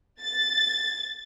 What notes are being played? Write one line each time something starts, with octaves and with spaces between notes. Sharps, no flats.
A6